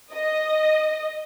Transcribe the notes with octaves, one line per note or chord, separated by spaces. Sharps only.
D#5